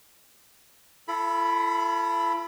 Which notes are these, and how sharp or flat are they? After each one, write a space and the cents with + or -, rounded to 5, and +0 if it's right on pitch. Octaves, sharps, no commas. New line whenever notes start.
E4 +45 A4 +0 B5 +0